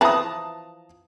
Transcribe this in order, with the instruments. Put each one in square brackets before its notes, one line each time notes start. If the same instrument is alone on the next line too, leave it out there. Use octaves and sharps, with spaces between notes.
[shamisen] E3 F3 B4 [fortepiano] A5 A#5 D#6